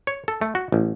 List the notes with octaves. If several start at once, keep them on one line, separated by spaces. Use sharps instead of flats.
C#5
A4
A3
F#4
A1